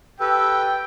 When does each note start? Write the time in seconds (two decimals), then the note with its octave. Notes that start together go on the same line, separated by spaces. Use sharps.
0.20 G4 A4 B4 G5 E6